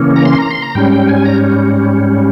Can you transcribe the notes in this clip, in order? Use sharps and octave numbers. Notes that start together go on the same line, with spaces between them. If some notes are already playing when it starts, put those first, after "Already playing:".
Already playing: C#3 E3 A#3 C#4
A#5
C6
A#5
C6
A#5
G#2 G3 C#4 G5
G5
G#5
A#5